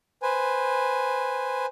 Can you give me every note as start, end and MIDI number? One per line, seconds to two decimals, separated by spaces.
0.22 1.66 71
0.22 1.66 72
0.22 1.66 80